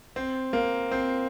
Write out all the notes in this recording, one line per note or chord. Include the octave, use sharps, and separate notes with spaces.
C4
A#3
C4